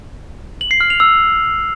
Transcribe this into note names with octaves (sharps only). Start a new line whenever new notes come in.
F#7
C7
F6
F7
E6